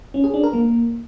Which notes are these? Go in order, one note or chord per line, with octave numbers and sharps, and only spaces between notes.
C#4
G#4
D4
A#4
A#3